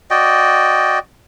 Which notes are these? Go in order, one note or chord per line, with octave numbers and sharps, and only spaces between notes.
F#4 D5 D#5 G5